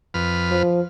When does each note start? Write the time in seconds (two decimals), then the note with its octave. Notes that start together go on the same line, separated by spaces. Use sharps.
0.14 F2 B4 F6
0.51 F3